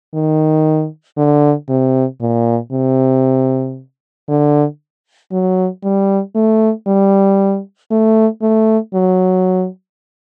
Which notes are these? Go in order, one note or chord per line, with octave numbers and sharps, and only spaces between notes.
D#3
D3
C3
A#2
C3
D3
F#3
G3
A3
G3
A3
A3
F#3